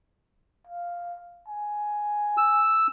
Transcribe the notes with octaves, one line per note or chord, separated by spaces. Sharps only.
F5
G#5
E6